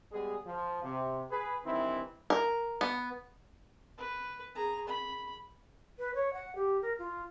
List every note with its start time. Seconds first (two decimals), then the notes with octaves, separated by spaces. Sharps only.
0.12 G3 G#3 B3 G#4
0.46 F3
0.84 C3
1.31 G#4 B4
1.65 G2 D#3 E3 C4 D#4 E4
2.30 A#4
2.81 B3
3.98 B4
4.55 G#4 A#5
4.87 B5
5.99 B4
6.15 C#5
6.33 F#5
6.56 G4
6.82 A#4
6.99 F4